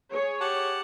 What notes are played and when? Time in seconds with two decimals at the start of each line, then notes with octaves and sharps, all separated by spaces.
0.11 G#4 C#5
0.40 G4 F#5 A5